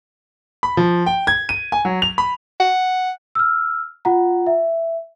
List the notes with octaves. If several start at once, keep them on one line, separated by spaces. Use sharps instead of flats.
B5
F3
G5
G#6
D#7
G#5
F#3
F7
B5
F#5
E6 F6
F4 F#5 A#5
E5